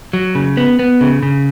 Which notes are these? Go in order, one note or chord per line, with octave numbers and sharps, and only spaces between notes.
F#3
C#3
B3
B3
C#3
C#3